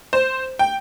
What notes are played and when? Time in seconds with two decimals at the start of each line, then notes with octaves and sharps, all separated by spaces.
0.13 C5
0.59 G5